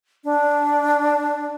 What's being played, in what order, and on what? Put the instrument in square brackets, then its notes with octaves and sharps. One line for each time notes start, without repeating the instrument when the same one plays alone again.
[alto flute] D4